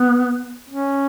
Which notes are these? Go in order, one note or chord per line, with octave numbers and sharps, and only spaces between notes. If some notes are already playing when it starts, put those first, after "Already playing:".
Already playing: B3
C#4